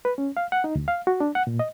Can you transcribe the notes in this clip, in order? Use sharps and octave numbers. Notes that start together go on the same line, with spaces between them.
B4
C#4
F5
F#5
D#4
D2
F5
F#4
D4
F#5
A#2
D#5